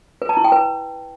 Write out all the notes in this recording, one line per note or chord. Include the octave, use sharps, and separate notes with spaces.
B4
A5
E4
G5
B4